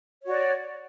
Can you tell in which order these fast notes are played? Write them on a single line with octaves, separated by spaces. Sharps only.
C#5 F#4 D5